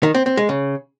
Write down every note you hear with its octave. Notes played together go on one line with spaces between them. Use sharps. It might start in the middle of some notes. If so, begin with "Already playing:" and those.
D#3
C4
C4
G#3
C#3